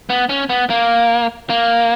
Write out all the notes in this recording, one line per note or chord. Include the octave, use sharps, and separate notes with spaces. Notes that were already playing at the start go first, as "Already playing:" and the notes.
B3
C#4
B3
A#3
A#3